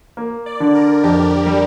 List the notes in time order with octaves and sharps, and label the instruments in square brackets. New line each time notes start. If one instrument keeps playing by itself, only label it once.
[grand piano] A#3
[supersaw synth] D5
[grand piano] D3
[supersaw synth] A#4
[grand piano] F2 [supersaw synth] G4
[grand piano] G3